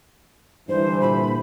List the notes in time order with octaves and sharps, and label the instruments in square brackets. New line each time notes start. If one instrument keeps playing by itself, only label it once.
[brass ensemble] G2 D3 E3 [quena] C5
[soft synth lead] A#2 [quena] B5